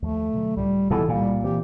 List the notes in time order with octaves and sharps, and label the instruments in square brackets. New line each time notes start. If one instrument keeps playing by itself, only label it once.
[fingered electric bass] D#2 F3 [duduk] A3
[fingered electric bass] B2 D3 F#3
[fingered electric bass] C#2 A2 [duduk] G3
[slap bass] B2 E3 [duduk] A4
[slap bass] A#2 [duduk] G3
[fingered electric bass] E3 C4 [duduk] G4